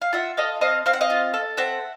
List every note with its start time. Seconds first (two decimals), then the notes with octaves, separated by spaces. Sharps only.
0.02 F5
0.13 F4 E5 F#5
0.37 A4 D#5 F5
0.61 C4 D#5 F5
0.86 C4 F5
0.93 F#5
1.01 D#5 F5
1.10 F4
1.34 A4
1.57 C4 E5 F#5